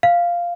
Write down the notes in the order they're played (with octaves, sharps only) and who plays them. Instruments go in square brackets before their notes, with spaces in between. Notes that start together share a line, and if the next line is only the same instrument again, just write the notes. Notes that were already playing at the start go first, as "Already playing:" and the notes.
[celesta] F5